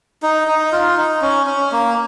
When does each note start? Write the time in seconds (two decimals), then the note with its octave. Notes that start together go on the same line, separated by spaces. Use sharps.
0.22 D#4
0.47 D#4
0.72 F4
0.97 D#4
1.21 C#4
1.47 C#4
1.72 A#3